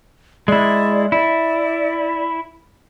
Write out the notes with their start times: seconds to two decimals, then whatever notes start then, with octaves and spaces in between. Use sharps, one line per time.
0.48 G#3 E4 D5
1.12 E4 D5